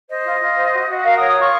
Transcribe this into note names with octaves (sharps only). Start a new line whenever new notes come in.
C5 D#5
F4
F4
C5
F#4
F#4
A#4 F5
D#6
C#5
D#6
F4 C#6